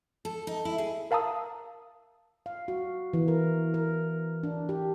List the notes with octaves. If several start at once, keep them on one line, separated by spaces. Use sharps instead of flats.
A4
D#4
E4
G#4
A#4 F5 A5 A#5 D#6 E6
F5
F#4
E3
A#4
A#4
D4
G4